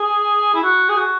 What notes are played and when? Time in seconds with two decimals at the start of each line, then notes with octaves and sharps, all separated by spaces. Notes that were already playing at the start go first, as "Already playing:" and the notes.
Already playing: G#4
0.54 E4
0.63 F#4
0.89 G#4
0.97 F#4